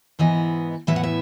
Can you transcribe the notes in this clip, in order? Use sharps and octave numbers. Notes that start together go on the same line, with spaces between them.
G#2 E3 B3 D#5
A2 E3 B3 E4 E5
F#5
E5